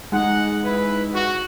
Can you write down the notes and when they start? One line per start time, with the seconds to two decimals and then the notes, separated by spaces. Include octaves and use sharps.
0.12 G#3 D#4 F#5
0.63 E4 B4
1.13 F#4